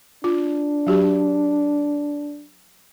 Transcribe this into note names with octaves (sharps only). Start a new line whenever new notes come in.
D4 F4
F#3 F#4 G4